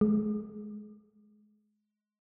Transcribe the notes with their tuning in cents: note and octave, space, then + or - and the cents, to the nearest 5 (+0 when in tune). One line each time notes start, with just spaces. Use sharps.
G#3 +25